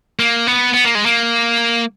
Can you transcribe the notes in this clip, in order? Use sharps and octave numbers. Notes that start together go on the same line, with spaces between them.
A#3
B3
B3
A#3
G#3
A#3